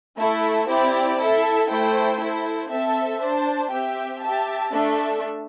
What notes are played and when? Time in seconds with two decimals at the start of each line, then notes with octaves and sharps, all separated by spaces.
0.17 A3 E4 A4 E5
0.68 C4 E4 G4 D5
1.18 E4 A4 E5
1.69 A3 E4 A4 C5 G5
2.19 E4 A4 C5
2.70 C4 A4 E5 A5
3.20 D4 C5 A5
3.71 C4 G4 E5 G5
4.21 G4 E5 A5
4.71 A3 D4 A4 E5